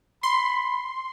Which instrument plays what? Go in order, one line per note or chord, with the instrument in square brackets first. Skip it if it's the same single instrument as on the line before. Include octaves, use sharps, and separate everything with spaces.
[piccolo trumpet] B5 [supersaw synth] C6